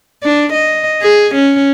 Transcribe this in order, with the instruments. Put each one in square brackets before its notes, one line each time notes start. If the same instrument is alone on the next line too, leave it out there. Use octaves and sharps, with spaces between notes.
[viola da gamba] D4
D#5
G#4
C#4